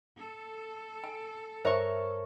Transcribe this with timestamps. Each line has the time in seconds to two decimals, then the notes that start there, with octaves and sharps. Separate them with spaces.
0.17 A4
1.04 G#5
1.65 G2 A#4 C5 C#5 E5 C#6